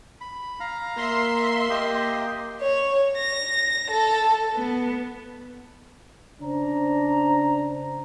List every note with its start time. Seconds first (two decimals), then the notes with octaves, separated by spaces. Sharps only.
0.21 B5
0.60 F5 A#5
0.97 A#3 E5 C6
1.70 A#3 G4 D#5
2.61 C#5
3.16 A#6
3.89 A4
4.53 B3
6.42 C#3 D4 C5 A#5